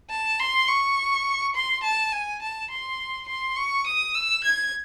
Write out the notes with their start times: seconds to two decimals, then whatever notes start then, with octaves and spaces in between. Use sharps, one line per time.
0.10 A5
0.39 C6
0.68 C#6
1.55 C6
1.83 A5
2.12 G#5
2.42 A5
2.70 C6
3.28 C6
3.57 C#6
3.87 D#6
4.15 E6
4.45 G#6